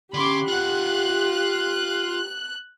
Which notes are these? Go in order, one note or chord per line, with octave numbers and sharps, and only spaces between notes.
D3 C#4 G4 B5 C6 D6
F4 F#5 F#6